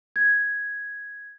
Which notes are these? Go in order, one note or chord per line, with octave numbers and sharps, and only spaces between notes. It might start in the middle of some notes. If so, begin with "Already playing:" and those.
G#6